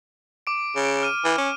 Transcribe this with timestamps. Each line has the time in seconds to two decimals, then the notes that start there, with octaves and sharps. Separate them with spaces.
0.47 D6 D7
0.76 C#3
1.03 F6 D#7
1.25 E3
1.38 C#4